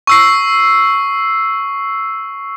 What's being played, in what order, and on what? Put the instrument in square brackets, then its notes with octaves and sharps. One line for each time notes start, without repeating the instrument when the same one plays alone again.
[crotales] C#6 E6 C7